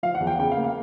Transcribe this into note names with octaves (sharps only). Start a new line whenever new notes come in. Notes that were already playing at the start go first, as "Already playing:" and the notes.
F3 F5
F#5
E2
G5
C#3 G5
F5
A#3
F5